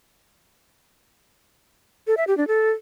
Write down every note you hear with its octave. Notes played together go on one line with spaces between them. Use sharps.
A4
E5
G4
D4
A4